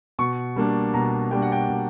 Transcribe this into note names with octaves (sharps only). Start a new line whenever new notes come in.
B2 C#6
G3 A#3 D4
B2 A#5
G3 A#3 D4 G5
F#5
G5
B2